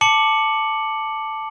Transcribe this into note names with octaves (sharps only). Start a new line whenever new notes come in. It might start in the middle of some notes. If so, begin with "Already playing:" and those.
A5 D6 C#7 F#7